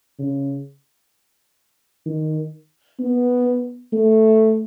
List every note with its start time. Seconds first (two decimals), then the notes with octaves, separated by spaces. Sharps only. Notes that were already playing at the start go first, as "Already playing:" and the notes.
0.19 C#3
2.06 D#3
3.00 B3
3.93 A3